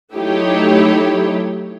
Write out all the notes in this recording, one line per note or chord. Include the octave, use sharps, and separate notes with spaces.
F#3 A3 D#4 E4 G4 C#5